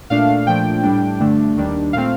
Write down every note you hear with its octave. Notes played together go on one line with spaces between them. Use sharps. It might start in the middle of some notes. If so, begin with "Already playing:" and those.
A#2 A3 D4 F5
A#2 F3 A3 D4 G5
A2 G3 D4
G2 D3 A3 D4
D#2 D#3 G3 D4
A#2 A3 C4 F5